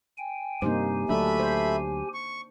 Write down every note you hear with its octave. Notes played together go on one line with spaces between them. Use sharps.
G5 G#5
G2 C3 A#3 D#4 G4 C5 G#5
D2 F#3 A3 D4 E5 B5
C5
C#6